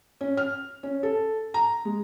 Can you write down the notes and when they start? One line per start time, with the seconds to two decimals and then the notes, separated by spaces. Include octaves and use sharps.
0.21 C#4
0.37 F6
0.83 C#4
1.03 A4
1.54 A#5
1.85 G#3